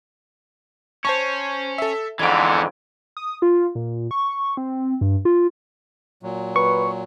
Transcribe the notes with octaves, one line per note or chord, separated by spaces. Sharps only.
C#4 C5 A5 C#6
A4 E5
F2 G#2 D3 E3 B3 G#6 D7
D#6
F4
A#2
C#6
C4
G2
F4
A#2 F#3
B4 C#6